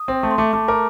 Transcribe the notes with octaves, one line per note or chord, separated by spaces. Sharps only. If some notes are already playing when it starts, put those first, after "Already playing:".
Already playing: D#6
C4
A3
C6
A3 D6
A3 D6
A#4 D6